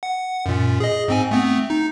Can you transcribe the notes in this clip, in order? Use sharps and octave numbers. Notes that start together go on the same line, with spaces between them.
F#5
F#2 A#2
G#4 D#5
G#2 C4 G#5
A3 B3 C4
D#4